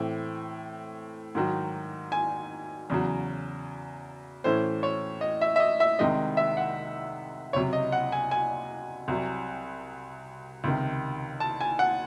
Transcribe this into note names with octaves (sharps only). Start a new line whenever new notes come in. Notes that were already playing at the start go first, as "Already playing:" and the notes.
Already playing: A2 E3 C4
G#2 D#3 F#3
G#5
E2 C#3 F#3
A2 E3 A3 C#4 C5
C#5
D#5
E5
E5
D#5
E5
C2 C3 D#3 G#3 D#5
E5
F#5
C#2 C3 F#3 C#5
D#5
F#5
G#5
G#5
C2 C3 F#3
C#2 C3 D#3
A5
G#5
F#5